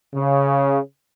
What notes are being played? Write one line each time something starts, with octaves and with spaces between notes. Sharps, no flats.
C#3